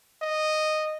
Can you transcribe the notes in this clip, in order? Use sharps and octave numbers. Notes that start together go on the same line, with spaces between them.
D#5